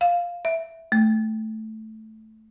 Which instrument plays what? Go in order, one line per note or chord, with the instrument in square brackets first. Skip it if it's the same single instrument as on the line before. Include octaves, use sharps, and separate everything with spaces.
[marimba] F5
E5
A3